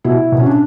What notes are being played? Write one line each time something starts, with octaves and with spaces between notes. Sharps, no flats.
B2 E4
B2
C#4
D4